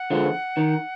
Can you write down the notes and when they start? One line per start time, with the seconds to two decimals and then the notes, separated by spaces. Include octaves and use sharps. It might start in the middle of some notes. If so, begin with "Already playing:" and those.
Already playing: F#5
0.11 D3 F3 G#3
0.57 D#3